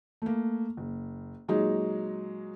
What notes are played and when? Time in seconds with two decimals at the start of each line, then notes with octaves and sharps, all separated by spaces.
0.22 A3 A#3
0.77 F#1
1.48 A#2 F#3 G#3 D#4